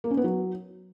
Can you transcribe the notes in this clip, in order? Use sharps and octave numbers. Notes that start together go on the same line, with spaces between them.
A#3
C#4
B3
F#3